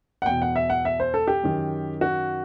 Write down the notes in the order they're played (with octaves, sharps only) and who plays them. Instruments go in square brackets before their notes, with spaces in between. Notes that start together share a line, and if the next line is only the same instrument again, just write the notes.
[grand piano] F#5
E2 B2 G5
F#5
E5
F#5
E5
C5
A4
G4
F#2 D#3
F#4